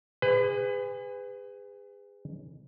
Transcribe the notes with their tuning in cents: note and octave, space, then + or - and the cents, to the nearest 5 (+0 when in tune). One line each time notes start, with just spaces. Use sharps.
G#4 -30 B4 +30